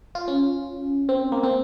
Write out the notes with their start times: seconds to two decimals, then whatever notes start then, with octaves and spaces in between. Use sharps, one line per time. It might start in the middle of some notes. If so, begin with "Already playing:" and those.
0.15 F4
0.28 C#4
1.09 C4
1.32 A#3
1.43 C4